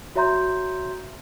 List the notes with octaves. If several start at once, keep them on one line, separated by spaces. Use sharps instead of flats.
F#4 C#5 E5 A#5 C6 G6